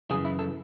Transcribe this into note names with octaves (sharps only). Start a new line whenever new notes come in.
F#2 C#3 E3 G#4
E4
A4